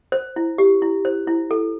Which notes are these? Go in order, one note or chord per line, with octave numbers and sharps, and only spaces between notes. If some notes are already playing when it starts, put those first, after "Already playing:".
C5
E4
G4
E4
C5
E4
A4